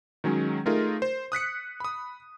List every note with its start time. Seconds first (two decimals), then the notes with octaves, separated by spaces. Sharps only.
0.24 D#3 F#3 G#3 C#4
0.66 A3 D#4 F4 G#4 A#4
1.02 C5
1.32 D#6 F#6 B6 C#7
1.80 B5 D#6